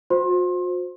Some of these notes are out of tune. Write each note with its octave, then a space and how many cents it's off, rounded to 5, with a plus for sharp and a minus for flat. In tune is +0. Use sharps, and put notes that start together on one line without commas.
F#4 -45 C5 +0 C6 +30